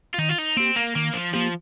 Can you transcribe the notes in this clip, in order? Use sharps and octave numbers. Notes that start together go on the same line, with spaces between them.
F4
D#3 D#4
F4
D#4
A#3 C4 G4
A#3
D#3 A#3
F3
F3 A#3 G4